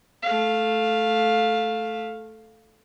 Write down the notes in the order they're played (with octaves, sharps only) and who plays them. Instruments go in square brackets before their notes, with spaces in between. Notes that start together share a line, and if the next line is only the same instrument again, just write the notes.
[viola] A3 F5